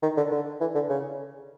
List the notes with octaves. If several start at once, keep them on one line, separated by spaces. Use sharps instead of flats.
D#3
D3
D3
E3
D3
C#3